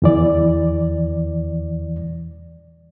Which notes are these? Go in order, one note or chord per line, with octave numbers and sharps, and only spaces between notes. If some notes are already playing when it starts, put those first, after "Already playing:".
E2 E3 D5